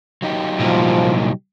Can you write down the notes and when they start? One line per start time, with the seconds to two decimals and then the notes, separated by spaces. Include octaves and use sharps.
0.22 F#3 D#4 G4
0.59 C2 A#2 F3